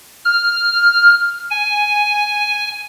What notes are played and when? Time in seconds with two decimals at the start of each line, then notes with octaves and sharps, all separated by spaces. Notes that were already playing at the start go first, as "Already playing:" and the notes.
0.25 F6
1.50 G#5